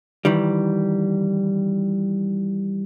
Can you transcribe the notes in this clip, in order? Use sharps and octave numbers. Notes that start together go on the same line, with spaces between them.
D#3 E3 G3